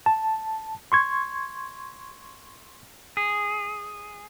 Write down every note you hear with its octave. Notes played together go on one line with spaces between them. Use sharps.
A5
C6 C#6 G#6
G#4